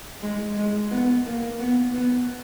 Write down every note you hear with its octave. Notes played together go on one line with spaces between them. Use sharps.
G#3
G#3
B3
A#3
B3
B3